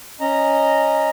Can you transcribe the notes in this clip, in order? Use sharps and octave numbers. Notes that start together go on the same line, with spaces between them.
C#4 D#5 A#5